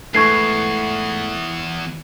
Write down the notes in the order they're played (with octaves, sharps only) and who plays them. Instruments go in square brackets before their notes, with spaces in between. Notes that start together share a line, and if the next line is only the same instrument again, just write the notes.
[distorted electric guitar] E2 [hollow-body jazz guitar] G#2 E3 A3 [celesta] C#6 G#6 C7